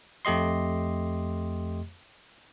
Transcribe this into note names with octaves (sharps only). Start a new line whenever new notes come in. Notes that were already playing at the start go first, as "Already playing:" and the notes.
F2 A3 G4 D#5 C6